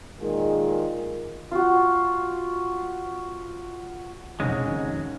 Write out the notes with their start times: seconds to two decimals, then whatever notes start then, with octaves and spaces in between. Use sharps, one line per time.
0.20 A#2 D#3 G#3 F4 G#4 A#4
1.51 F4 F#4
4.40 F#1 B1 F2 F#3 G#3 C#4
4.66 D#2